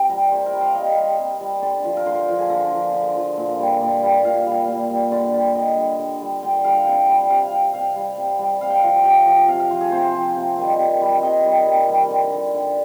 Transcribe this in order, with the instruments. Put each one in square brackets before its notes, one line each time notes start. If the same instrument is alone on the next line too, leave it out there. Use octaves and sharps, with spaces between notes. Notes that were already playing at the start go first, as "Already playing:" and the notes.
Already playing: [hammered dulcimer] C3 G4
G3 A#4
C3 C5
A#4
G3
F5
C3 D#5
G3
C3
G3
D3 D5
F3
A#4
D3 C5
F3
G#4
D3 A#4
F3
D3
F3
A#2
G3
A#2 D5
G3
A#2 F5
G3
A#2
G3
D3 D5
G3
D3 D#5
G3
D3
G3
D3 G5
G3 F5
C3 G5
G3
C3 F5
G3
C3 F5
G3
C3
G3
C3 F5
G5
F3 F5
C3 G5
F3
C3 F5
F5
F3 C5
G#4
C3 C5
F3
C3
D#3 G3
C3
D#3 G3
C3 D#5
D#3 G3
C3
D#3 G3
D3
G3
D3